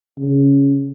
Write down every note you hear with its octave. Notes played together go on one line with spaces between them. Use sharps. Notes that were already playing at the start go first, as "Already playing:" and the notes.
C#3